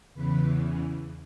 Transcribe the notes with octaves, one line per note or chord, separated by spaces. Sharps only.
E2 C#3 E3 B4